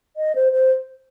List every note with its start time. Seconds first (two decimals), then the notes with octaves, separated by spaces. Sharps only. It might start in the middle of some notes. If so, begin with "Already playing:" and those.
0.17 D#5
0.35 C5
0.53 C5